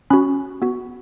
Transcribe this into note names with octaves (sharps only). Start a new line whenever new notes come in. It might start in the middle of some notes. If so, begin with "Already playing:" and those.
C#4 F#4 B5
B3 F#4